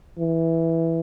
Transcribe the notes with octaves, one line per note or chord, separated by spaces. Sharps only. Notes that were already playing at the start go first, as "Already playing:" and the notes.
E3